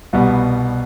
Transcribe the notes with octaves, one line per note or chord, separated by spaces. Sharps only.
C2 B2 G3 B3